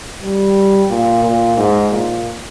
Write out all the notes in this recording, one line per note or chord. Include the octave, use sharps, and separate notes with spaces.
G3
A#2
A#2
G#2
A#2